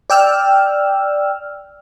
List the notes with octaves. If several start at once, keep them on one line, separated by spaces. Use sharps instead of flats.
D5 G5 E6 F6